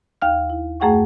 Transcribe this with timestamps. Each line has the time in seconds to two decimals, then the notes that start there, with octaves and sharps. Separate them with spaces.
0.22 D#2 F5 F6
0.50 E4
0.80 F#2 A3 G#4 F#5 G5 C#6